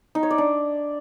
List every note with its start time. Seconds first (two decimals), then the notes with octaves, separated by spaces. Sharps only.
0.15 D#4
0.23 C#5
0.30 D5
0.38 D4